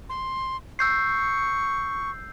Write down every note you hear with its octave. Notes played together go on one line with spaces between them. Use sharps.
C6
C#6 E6 G6 C7